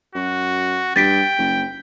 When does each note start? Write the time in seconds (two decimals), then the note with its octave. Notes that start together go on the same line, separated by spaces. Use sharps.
0.15 F#2 F#4
0.96 G2 G5 A6 B6 D7
1.38 F#1